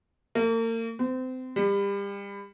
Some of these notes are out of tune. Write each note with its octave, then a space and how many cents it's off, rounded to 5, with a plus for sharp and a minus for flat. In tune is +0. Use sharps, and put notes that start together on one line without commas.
A#3 -40
C4 -30
G3 +30